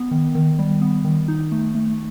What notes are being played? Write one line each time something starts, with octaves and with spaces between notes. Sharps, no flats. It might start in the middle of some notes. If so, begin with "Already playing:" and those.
Already playing: B3
D#3
D#3
G3
B3
D#3
D#4
A3
A3